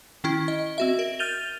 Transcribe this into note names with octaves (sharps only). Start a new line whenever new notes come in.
D#3 C#4 E4
D#5
C4 F#4 E5
A#4
F6 G6 A6 D#7 F7 G7